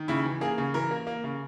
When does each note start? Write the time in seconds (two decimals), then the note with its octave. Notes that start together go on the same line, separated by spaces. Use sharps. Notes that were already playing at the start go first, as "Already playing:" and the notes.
Already playing: D#3
0.08 C#3 E4
0.25 E3
0.41 A#3 G#4
0.58 C#3
0.74 E3 A#4
0.91 A#3
1.07 A#3
1.24 C#3